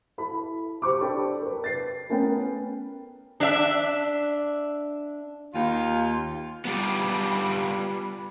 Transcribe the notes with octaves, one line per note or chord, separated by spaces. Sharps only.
E4 A4 B5
G4 C5 C#6 D6
D4 A4 D5 G5 B5
A#4 B4
A6 C7
A3 B3 C#4 A#4 B4 G5
D4 E5
D#2 F4
G3 B3 F4 G4 B4